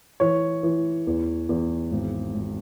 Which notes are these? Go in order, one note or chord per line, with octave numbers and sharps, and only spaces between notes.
E3 C#5
E3
E2
E2
G#1
G#1